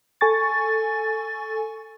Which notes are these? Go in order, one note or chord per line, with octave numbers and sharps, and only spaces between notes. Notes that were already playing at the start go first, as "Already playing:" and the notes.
A4 G#5 C#6 A6